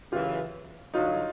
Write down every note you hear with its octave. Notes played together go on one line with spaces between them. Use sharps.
F#2 C#3 E3 F4 G4
G2 D3 F#3 D#4 F4